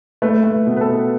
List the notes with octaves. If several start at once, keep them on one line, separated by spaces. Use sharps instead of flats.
A3 B4
A3
B2
B4
A4
B2